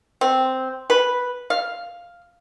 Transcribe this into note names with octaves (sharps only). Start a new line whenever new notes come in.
C4
B4
F5